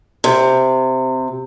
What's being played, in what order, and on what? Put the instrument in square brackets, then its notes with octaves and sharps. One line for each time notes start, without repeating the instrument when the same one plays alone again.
[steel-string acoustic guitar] C3